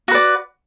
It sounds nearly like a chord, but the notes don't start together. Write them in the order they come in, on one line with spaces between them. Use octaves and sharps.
F#4 B4 D5